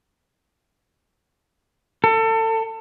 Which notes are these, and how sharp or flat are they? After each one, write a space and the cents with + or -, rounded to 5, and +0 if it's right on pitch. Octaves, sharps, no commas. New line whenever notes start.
A4 +30